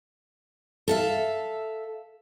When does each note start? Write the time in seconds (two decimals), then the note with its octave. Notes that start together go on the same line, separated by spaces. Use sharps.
0.88 A4 E5 F5